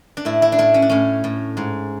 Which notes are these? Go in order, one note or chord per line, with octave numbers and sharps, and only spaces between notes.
D4
A2 E4
E4
D4
A2 E4
C#4
D4
A2 C#4
A2
G#2